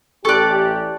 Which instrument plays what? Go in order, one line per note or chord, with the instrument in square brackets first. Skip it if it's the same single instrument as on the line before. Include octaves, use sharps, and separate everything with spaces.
[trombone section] A1 G4 [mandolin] A4 D5 [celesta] C#6 F#6